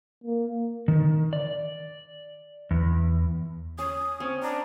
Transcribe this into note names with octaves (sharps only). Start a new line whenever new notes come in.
A#3
D#3
D5
E2
C#4 D#6
C4 C#4
D4 A#5